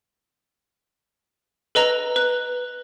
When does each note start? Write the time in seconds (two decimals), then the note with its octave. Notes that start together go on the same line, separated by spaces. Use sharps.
1.75 A4 B4 D#5 A#5
2.16 B4 F#6